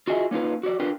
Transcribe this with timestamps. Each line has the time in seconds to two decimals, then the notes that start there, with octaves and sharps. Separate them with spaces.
0.07 F4 F#4 G#4 D#5 E5
0.31 A#3 C#4 D#4 F4 B4
0.63 F#4 G4 C#5 D5
0.80 D4 F4 G4 A#4 B4